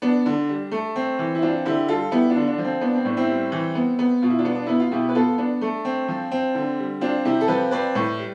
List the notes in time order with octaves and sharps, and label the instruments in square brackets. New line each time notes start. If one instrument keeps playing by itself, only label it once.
[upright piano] B3 D4
D3
G3
A3
C4
E3
E4
C4 D4 F4
D3 E4 G4
G3 F4 A4
B3 E4 G4
D4 F4
D3
D4
F3
C4
B3 D4
C4
A2 D4
C4 E4
G3
E3
B3
B3
B2 F4
E4
D4 F4
B3
D4
B3 E4
F4
B2 E4 G4
B4
B3 F4 A4
B3 D4
A3
C4
F3
C4
D3
G3
C4 D4 F4
C3 E4 G4
A4
F3 G4 B4
C4 B4 D5
A2
G3